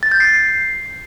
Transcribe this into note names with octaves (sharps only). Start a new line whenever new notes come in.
A6
G6
C7